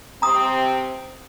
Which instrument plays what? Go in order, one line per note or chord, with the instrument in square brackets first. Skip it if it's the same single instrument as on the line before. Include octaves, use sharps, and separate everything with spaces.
[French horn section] C3 C4 [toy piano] A#5 D#6